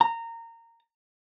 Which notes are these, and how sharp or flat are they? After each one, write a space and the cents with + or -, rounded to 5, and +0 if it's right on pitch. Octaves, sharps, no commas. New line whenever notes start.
A#5 -20